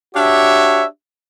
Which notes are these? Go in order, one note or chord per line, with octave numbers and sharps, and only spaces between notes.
D4 F#4 G4 C#5 E5